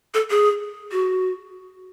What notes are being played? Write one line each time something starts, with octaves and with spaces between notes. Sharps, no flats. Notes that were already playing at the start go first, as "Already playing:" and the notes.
A4
G#4
F#4